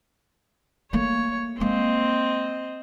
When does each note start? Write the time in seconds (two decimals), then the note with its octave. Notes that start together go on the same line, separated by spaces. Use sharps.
0.93 A3 A#3 C#5
1.60 G#3 A#3 C4 D#5